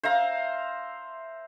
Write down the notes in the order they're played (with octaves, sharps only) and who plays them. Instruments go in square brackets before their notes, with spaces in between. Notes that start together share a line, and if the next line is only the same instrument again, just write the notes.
[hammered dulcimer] C5 E5 F5 A#5